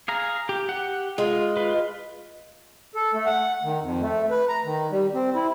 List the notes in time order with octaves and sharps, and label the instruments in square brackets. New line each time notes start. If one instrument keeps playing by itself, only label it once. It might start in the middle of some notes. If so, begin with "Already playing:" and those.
[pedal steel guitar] G#4 F5 A#5
G4
G4 F#5
[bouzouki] G#3 [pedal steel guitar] F4
[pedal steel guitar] F4 B4
[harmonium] A4
A3
F#5
D#3
F2
A3
B4
A#5
D#3
G3
C4
E4